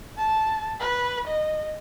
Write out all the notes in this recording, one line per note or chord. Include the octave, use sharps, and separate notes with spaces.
A5
B4
D#5